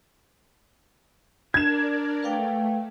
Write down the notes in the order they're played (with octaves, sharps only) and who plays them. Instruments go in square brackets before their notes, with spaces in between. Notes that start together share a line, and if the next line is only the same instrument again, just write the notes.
[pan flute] D4 [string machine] A#4 D5 [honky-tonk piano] G#6 E7
[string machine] A3 [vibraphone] B4 F5 G5